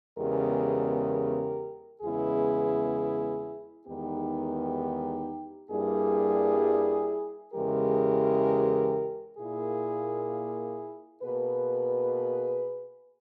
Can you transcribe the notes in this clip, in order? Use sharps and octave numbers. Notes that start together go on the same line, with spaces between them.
E2 C#3 G#3 B3 G4 A#4
E2 C#3 G#3 B3 E4 G#4
E2 D#3 G#3 B3 D#4 G4
G2 G3 A#3 E4 G#4
E2 C#3 E3 G#3 G4 A#4
A#2 A#3 E4 G#4
B2 A#3 G#4 B4